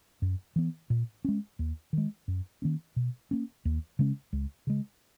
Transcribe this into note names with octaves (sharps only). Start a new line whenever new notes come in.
F#2
E3 B3
A#2
G#3 C#4
D#2
D#3 G#3
F#2
D#3 A#3 C#4
B2
A#3 C#4
D#2
C#3 G#3 C#4
C#2
C#3 G#3